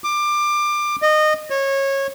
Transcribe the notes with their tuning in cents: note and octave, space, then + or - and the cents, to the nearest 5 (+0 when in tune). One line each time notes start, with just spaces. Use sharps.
D6 +20
D#5 -20
C#5 -20